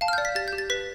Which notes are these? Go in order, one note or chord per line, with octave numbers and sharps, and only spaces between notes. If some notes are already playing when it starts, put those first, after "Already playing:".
F5 A5
F6
G6
D5
B6
G4 A6
G6
G4
A6
B4 B6